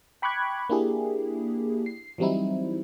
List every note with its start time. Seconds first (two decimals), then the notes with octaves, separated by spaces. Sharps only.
0.22 G5 B5 C#6 D6 F#6 G#6
0.70 A#3 D4 E4 G4 G#4
1.86 C7
2.18 E3 F#3 G3 C4 D#4 E4